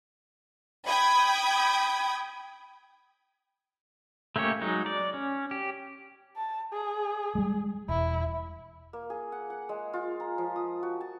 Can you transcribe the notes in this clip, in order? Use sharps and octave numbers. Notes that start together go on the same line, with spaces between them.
G5 B5 D#6 G#6
A3 A#3 C#4 G4 C#5
F#3 G#3 D#4
D5
C#4
G4
A5
G#4
G3 G#3
E1 E4
A#3
G#4
F#5
F#5
G#3
F4
A#5
F3
D#6
F#4
A5